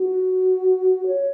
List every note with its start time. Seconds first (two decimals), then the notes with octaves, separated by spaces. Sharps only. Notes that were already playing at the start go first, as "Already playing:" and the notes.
Already playing: F#4
1.07 C#5